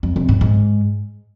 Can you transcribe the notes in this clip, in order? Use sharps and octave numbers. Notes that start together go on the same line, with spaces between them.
F2
C3
G#2
G#2